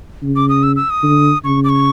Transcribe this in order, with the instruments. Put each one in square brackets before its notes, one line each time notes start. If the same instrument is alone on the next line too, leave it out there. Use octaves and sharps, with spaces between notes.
[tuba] C#3
[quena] D6
D#6
E6
E6
D#6
[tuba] D3
[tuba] C#3 [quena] C#6
[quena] D6
C#6